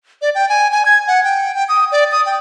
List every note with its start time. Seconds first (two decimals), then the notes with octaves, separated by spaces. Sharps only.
0.22 D5
0.35 G5
0.49 G#5
0.72 G#5
0.86 G#6
1.07 F#5
1.24 G5
1.55 G5
1.69 D#6
1.92 D5
2.12 D#6
2.26 G5